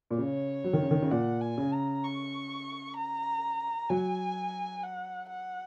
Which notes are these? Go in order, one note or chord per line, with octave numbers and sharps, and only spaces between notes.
A#2
C#3 C#5
F#3
D#3
C#3
D#3
C#3
A#2 F#5
G#5
C#3
A#5
C#6
A#5
F#3 G#5
F#5
F#5